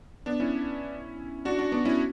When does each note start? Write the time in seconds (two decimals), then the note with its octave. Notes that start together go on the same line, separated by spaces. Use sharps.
0.26 B3 D4
0.40 C#4 E4
1.45 D4 F#4
1.59 D4 F#4
1.72 B3 D4
1.85 C#4 E4